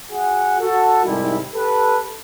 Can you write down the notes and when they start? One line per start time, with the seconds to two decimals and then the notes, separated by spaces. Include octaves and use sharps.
0.11 F#4 G#4 F#5
0.60 F#4 A4
1.04 F2 G#2 C3 D#3 G3 E4
1.54 G4 A4 B4